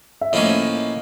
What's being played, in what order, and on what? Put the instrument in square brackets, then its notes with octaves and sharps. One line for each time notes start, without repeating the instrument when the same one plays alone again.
[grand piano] E5
[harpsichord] A2 F3 A#3 C#4 [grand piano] D#5